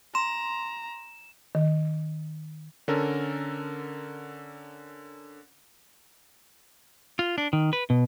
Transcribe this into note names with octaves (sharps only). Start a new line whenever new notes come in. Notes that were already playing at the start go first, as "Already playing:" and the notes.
A#5 C6 E7
D#3
D3 C#4 A4 A#4
F4
D4
D#3
B4
B2